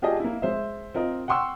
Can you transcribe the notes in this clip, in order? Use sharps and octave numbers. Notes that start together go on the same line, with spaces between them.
F4 G4 G#4 D5 D#5 A5
A#3 E4
G#3 C5 E5
C4 F4 A#4 D#5
F#5 G5 C6 C#6 E6